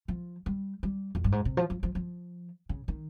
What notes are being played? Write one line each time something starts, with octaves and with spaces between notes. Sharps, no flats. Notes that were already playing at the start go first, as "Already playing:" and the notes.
F3
G3
G3
F2
G2
G#2
C3
F3
F3
F3
F3
C#3
D#3